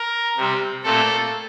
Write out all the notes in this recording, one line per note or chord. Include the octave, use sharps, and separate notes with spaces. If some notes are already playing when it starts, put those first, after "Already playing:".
Already playing: A#4
C3 G3 C4
A#2 A3 C4 A4